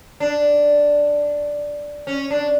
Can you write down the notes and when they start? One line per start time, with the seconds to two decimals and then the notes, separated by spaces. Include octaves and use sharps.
0.20 D4
2.07 C#4
2.30 D4